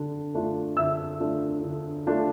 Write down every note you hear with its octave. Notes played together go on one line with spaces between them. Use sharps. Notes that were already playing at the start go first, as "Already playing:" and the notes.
Already playing: D3 D4
A3 D4 F4
D3 E5 E6
A3 D4 F4
D3
A3 D4 F4